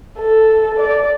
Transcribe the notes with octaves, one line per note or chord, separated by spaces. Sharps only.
A4
D5